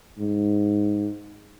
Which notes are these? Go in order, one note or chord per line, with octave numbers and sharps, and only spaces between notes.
G#2